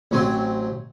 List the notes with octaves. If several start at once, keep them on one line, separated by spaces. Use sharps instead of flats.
A1 F#3 C4 G#5 C6